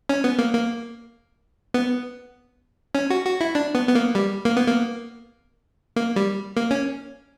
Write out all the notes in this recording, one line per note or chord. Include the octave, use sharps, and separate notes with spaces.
C#4
B3
A#3
A#3
B3
C#4
F#4
F#4
E4
D4
B3
B3
A#3
G3
A#3
B3
A#3
A#3
G3
A#3
C#4